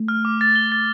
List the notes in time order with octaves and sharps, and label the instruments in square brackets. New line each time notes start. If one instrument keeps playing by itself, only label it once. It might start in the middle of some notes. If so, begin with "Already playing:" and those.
Already playing: [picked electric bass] A3
[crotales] F6
D6
A6
G7
A6